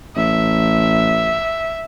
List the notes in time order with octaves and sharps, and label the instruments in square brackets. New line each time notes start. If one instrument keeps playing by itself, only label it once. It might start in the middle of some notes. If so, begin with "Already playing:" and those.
[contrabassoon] A1 [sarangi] E5